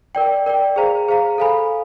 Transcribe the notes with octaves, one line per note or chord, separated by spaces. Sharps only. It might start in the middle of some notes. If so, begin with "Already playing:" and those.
A#4 D5 G5
A#4 D5 G5
G#4 C5 F5 A#5
G#4 C5 F5 A#5
A4 C5 F5 G#5 B5